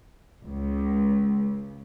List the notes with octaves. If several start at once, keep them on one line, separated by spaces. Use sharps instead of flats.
C#2